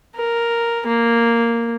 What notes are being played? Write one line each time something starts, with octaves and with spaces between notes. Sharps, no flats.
A#4
A#3